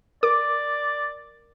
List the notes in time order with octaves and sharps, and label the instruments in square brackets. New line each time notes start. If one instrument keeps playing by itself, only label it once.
[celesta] A#4 [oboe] D5 [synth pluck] D6